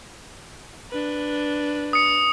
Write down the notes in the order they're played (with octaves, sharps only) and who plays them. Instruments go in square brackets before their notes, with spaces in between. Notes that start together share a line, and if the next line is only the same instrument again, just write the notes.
[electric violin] D4 B4
[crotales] D#6 C#7